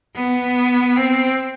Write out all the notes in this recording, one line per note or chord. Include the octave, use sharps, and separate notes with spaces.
B3
C4